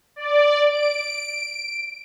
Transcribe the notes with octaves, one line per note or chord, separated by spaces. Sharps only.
D5
D7